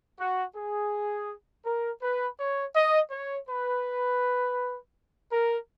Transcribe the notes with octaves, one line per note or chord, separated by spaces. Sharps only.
F#4
G#4
A#4
B4
C#5
D#5
C#5
B4
A#4